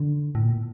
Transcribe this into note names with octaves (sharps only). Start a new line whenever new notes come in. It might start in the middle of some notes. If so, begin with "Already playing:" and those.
Already playing: D3
A2
A#2